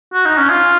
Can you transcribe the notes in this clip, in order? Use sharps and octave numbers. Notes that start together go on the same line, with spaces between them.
F#4
D#4
C#4
F4